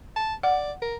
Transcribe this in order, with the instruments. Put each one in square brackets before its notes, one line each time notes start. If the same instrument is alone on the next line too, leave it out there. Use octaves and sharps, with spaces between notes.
[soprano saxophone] A5
[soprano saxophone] D5 [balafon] F#5
[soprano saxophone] A#4